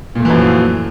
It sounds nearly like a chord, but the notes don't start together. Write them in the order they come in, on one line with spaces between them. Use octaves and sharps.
A#2 A3 E3 F#2 F3